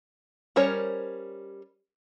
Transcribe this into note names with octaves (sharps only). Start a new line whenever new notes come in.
G3 C#4 A#4 C5 C#5